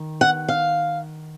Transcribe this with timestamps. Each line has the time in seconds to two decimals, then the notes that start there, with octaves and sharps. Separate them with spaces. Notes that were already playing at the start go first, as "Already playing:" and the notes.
Already playing: D#3
0.21 F#5
0.49 F5